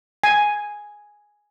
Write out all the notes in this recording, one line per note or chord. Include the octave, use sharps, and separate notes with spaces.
G#5